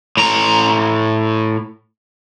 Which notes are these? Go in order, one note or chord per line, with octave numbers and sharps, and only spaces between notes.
A2 A#5